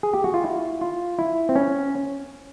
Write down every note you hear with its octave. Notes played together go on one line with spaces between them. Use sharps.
G#4
G4
F#4
F4
E4
F4
E4
C4
C#4